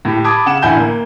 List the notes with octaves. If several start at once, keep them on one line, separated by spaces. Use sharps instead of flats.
A2 G4
A5 B5 D6 D#6 G#6
C#3 F#5 E7
A1 D3 E4 F#5 G#5 G6
A#3